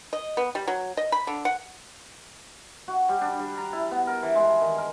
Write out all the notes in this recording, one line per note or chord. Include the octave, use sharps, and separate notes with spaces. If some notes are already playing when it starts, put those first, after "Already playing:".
D#5
B3
G3
F#3
D#5
B5
D3
F#5
F#4
G3
D4
G3
A#5
E4
B3
A#4
E3
G#3
D#3
A#4